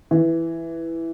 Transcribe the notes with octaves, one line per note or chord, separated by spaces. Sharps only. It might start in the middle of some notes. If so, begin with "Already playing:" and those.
E3